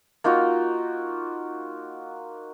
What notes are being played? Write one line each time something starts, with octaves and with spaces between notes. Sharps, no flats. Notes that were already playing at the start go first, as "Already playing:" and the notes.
A#3 D#4 F4 F#4